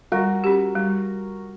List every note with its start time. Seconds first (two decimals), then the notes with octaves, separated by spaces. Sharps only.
0.12 G3 F#4 A#4
0.44 C#4 G4
0.76 G3